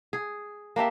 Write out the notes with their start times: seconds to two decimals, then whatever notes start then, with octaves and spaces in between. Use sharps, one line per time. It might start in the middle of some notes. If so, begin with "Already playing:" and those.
0.13 G#4
0.76 A#3 D4 G4 E5